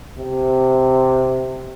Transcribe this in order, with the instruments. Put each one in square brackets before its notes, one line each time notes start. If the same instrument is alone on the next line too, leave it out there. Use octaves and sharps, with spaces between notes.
[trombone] C3